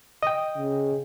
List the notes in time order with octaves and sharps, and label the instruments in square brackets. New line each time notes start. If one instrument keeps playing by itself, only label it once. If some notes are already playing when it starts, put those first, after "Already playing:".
[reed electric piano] D#5 G5
[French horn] C#3